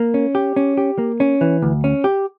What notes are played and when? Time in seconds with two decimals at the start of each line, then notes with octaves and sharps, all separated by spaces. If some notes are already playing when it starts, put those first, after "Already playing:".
Already playing: A#3
0.14 C#4
0.35 G4
0.56 C#4
0.78 G4
0.98 A#3
1.20 C#4
1.41 E3
1.62 D2
1.84 C#4
2.04 G4